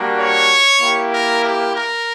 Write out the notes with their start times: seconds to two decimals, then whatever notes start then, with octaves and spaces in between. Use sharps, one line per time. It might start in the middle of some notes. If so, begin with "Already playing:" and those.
Already playing: G3 A#3 D4 F#4
0.19 C#5
0.81 A#3 E4 G4
1.12 A#4
1.43 G4
1.74 A#4